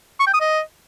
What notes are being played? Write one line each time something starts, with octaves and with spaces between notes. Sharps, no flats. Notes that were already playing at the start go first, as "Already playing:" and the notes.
C#6
G5
D#6
D#5